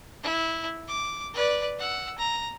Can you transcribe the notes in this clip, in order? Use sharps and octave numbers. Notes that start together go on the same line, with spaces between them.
E4
D6
B4 D5
F#5 E6
A#5